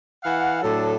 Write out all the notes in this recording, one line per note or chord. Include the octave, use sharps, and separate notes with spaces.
E3 F5 F#5
A2 F#3 D4 A4